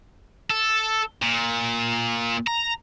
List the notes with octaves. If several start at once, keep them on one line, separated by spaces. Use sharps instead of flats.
A4
A#2
A#5